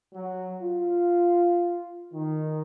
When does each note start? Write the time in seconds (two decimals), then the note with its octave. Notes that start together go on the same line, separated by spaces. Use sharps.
0.14 F#3
0.61 F4
2.13 D#3